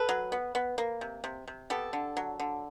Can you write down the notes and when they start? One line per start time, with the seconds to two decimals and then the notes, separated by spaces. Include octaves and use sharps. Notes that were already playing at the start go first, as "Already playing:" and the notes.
Already playing: A4 B4
0.09 F#3
0.32 B3
0.55 B3
0.78 A#3
1.01 C3
1.24 C3
1.48 C3
1.70 B3 G4 A4
1.93 D3
2.17 F#3
2.40 D3